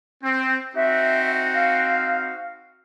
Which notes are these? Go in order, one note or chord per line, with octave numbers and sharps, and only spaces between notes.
C4
C4 D#4 F#4 E5
F5